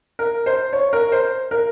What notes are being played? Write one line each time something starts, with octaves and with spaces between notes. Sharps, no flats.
A#4
C5
C#5
A#4
C5
A#4